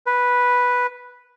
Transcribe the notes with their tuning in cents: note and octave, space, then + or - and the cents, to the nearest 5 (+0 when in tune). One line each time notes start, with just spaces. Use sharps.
B4 -5